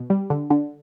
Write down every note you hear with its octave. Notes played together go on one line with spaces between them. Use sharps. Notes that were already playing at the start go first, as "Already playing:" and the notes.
Already playing: B2
G3
D3
D3